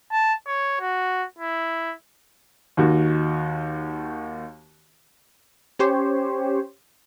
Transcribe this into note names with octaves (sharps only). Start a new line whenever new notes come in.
A5
C#5
F#4
E4
D#2 D#3 F#4
C#4 G4 C5 C#5